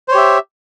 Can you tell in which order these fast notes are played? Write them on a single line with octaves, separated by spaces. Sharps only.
C5 C#5 G4 E5